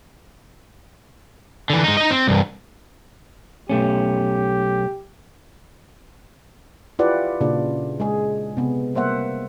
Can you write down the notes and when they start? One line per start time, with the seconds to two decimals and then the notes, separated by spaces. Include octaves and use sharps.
1.70 D3 E3
1.84 G#3 D#4
1.97 D#4 D#5
2.10 C4
2.28 C2 G2
3.69 B1 A3 C#4 G4
6.99 E4 F4 G4 B4 D5 F#5
7.41 A#2 C#3 D4 F4 D5
8.00 G#3 G#4
8.57 C3 B3
8.95 G3 A#3 C5 E5 F#5